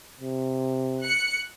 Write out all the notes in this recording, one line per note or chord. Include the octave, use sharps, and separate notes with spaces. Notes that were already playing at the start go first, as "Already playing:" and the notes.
C3
F#6 C#7